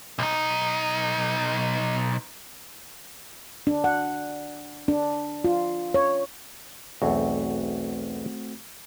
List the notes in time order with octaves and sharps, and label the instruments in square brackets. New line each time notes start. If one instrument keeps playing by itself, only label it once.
[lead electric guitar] B1 D#4
[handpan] D4
F#5
D4
F4
C#5
[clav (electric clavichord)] B1 E2 [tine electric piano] A3 C4 F#4